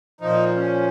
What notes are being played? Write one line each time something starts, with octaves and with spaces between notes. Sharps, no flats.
A#2 F3 D#4
C#4